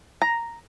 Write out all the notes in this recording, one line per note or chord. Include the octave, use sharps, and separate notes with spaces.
A#5